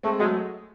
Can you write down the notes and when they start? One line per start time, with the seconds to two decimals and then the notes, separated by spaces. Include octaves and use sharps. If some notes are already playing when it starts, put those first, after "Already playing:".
0.03 G#3 A3 C4
0.19 F#3 G#3 A3